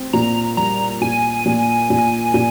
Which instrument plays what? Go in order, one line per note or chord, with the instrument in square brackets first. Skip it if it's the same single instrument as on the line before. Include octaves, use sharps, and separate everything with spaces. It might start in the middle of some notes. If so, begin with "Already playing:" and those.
Already playing: [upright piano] C4
[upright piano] A#2 [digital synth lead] A#5
[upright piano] G3 [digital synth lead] A#5
[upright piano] A#2 [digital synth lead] G#5
[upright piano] A#2
A#2
A#2